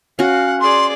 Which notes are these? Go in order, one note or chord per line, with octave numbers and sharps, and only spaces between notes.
C#4 F#4 F5 F#5
G#4 D5 C6